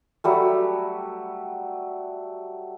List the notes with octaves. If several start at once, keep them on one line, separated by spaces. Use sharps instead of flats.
F#3 G3 A3